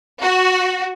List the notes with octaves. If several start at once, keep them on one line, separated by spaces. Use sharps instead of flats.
F#4